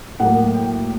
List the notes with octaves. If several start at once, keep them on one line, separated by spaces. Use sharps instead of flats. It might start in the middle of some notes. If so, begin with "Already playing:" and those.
A2 F#3 A#3 F#5
G5